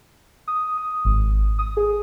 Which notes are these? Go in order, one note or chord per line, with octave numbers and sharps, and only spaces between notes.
D#6
D#6
G#1
D#6
G#4